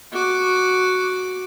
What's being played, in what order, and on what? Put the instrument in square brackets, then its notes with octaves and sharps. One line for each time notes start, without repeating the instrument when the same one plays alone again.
[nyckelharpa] F#4 D6